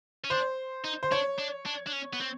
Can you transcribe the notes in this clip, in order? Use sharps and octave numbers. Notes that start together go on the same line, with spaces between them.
C#4
D4 C5
D#4
C5
D4 C#5
D4
D4
D4
C#4
B3
C4